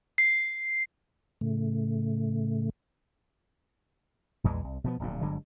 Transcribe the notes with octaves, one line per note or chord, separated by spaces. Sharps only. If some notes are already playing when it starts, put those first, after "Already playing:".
C7
A2 C#3 A3
A#1 E2 E3 G#3
C2
B2 F3 B3
D1 A#1 A#2
G1 D3 F#3 G#3